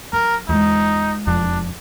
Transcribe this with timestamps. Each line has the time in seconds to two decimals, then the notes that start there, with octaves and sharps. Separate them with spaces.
0.13 F#3 A#4
0.49 E2 G#3 D#4 F4
1.27 E1 F2 F3 D4